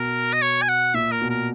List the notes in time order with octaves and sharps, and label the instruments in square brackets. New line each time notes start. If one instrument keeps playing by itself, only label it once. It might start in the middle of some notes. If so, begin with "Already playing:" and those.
Already playing: [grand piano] B2 [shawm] A#4
[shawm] D#5
C#5
G#5
F#5
[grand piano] A#2 [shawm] E5
[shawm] A#4
[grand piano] B2
[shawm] A#4